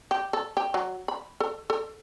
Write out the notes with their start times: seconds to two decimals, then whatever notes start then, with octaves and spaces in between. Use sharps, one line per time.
0.11 G4
0.33 A4
0.57 G4
0.74 F#3
1.08 B5
1.40 A4
1.70 A4